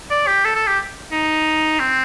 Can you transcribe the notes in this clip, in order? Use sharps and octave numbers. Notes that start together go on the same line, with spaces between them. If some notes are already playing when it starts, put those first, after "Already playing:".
D5
G4
A4
A4
G4
D#4
C4